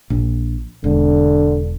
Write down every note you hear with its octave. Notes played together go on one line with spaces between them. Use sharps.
A#1
E1 D3